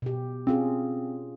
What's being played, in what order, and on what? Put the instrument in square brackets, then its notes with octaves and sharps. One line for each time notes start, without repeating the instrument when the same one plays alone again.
[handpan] B2 G4
[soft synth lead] C4 [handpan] C#4 F4 G#4